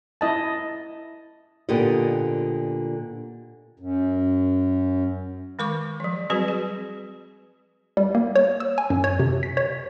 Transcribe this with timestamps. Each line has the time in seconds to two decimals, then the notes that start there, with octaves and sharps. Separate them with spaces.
0.21 E4 D#5 A5
1.69 A#2 D3 B3 G4 D#5
3.79 F#2
5.59 D#3 G#3 A#4 C#6 D6
6.00 F3 F#3
6.30 F#3 G3 C4 F#4 G#4 B4
6.48 G#4
7.97 G3
8.15 A#3
8.36 C#5
8.60 E6
8.78 G#5
8.90 F#2
9.04 C#5
9.20 C3
9.43 B6
9.57 C#5